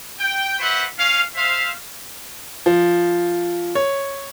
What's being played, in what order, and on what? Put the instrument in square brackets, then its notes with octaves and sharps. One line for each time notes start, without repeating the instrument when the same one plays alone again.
[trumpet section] G5
F4 F#4 B4 C5 E5 F#5
C#4 F5
C5 E5 F5
[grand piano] F3
C#5